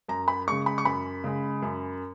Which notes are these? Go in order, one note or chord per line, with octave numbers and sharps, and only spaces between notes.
F#2 A#5
B5
C#3 G#3 C#6
B5
C#6
F#2 B5
C#3 G#3
F#2